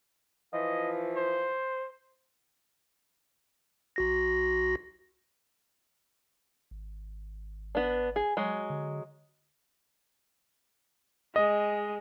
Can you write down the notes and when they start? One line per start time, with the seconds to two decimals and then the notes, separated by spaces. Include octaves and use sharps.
0.53 E3 F3 D#5
1.16 C5
3.96 B1 F#4 A#6
6.71 G#1
7.75 B3 D4
8.16 G#4
8.37 F#3 G#3
8.70 D3
11.36 G#3 D#5